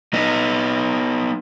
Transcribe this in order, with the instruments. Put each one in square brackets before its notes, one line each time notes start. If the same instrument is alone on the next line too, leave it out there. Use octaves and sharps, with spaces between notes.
[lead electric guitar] B3 D#4